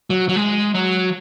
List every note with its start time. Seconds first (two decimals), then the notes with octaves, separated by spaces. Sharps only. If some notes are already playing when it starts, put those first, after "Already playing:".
0.10 F#3
0.29 F#3
0.36 G#3
0.74 F#3